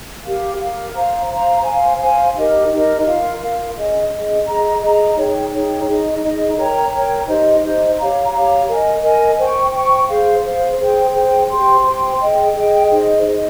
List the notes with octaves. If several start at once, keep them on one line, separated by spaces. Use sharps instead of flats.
G4 A#4 F5
G4 A#4 F5
C5 F5 A#5
C5 F5 A#5
C5 F5 G#5
C5 F5 G#5
D#4 G4 A#4 D#5
D#4 G4 A#4 D#5
F4 A#4 F5
F4 A#4 F5
C#4 G#4 D#5
C#4 G#4 D#5
G#4 D#5 A#5
G#4 D#5 A#5
D#4 G#4 C#5 G5
D#4 G#4 C#5 G5
D#4 G#4 D#5
D#4 G#4 D#5
A#4 C#5 G5 A#5
A#4 C#5 G5 A#5
D#4 G4 C5 D#5
D#4 G4 C5 D#5
G4 C#5 F5 A#5
G4 C#5 F5 A#5
A#4 D#5 G#5
A#4 D#5 G#5
C5 G5 C#6
C5 G5 C#6
G#4 C5 F5
G#4 C5 F5
G#4 C5 G5
G#4 C5 G5
G4 C5 G5 C6
G4 C5 G5 C6
G#4 D#5 G5
G#4 D#5 G5
D#4 G#4 C5 D#5
D#4 G#4 C5 D#5